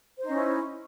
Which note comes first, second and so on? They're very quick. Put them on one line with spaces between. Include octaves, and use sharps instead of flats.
C5 D#4 C#4 E4